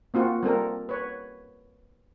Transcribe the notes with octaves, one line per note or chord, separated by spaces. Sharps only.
A#3 C4 F4 F#4
G3 C4 A4 A#4
B4 C#5